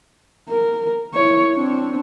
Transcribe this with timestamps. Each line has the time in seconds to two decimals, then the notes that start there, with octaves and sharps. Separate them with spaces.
0.49 A#4
1.14 E4 C#5
1.55 C4 D4